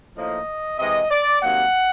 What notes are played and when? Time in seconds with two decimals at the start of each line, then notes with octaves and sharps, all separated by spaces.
0.17 A2 F3 A#3 D#4 D#5
0.79 C3 E3 G#3 D#5
1.11 D5
1.41 C3 D#3 F#3 A#3 F#5